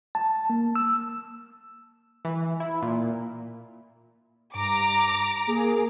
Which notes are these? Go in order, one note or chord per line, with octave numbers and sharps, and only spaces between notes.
A5
A#3
E6
E3
E4
A#2
G2 A#5 D6
A#3 G#4